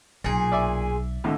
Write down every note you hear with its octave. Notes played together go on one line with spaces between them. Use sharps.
B1 A#2 G#4
D5 E5 D6
D#2 A2 D3